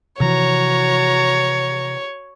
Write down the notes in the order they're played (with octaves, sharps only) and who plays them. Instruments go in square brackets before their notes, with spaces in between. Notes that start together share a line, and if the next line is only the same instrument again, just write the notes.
[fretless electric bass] C3 E3 F3 [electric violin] F#4 A#5 [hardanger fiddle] C#5